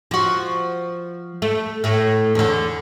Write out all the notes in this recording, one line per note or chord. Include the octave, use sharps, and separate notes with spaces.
F3 F#4
A3
A2 A3
E2 D3